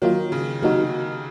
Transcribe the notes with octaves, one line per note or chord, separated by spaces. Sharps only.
D#3 F#3 A#3 F4
C#3
C3 F#3 A#3 D#4 F#4